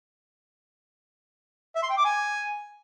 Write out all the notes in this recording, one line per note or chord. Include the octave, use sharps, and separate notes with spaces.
E5
C6
G5
D6
G#5